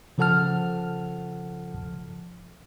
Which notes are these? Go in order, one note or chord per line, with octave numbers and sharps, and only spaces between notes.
C#3 F3 A4 F#5 A5 F6